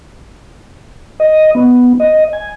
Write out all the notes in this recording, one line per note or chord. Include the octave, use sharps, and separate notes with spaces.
D#5
B3
D#5
G#5